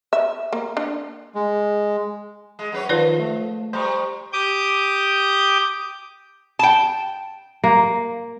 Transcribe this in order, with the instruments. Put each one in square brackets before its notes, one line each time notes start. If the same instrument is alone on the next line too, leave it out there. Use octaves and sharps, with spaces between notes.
[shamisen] E5
A#3
D4
[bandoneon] G#3
[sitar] G#3
F#2 B4 C#5
[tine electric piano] D#3 [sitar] F3 [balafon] F4 B4 D5
[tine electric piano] A3
[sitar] G3 [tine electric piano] C5 A#5 C#6
[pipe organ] G4 D6 D#6 G6
[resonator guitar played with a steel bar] G5 A5
[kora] A#3